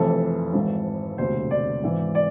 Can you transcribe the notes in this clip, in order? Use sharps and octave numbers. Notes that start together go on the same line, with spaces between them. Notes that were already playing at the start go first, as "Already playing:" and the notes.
Already playing: F1 F2 E3 A4
G#1 G#2 E3
E1 D2 C3 C5
D5
G#1 G#2 E3
D5